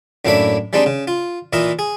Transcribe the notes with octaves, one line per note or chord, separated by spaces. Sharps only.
F#2 A2 A#3 D4 E4 B5
G3 G#3 C4 D4 D#4
C#3
F4
A#2 E3 E4 A#4 D#5
G#4